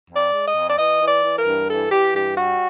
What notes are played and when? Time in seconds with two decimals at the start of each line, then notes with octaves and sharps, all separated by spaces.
0.09 F2
0.16 D5
0.32 G#3
0.47 D#5
0.55 F2
0.69 D5
0.77 E3 D#5
1.00 E3
1.08 D5
1.23 E3
1.38 A#4
1.45 G2
1.69 E3 A4
1.92 E3 G4
2.14 G2 G4
2.36 G3 F#4